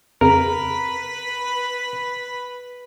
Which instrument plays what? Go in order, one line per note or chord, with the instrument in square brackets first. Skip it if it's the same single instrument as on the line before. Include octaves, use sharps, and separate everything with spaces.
[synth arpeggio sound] F2 C#3 [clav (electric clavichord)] A#4 [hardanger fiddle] B4 B5